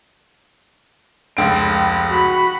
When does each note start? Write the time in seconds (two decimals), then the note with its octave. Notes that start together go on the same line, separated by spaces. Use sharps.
1.37 F1 C#2 D7
2.10 F#4 B5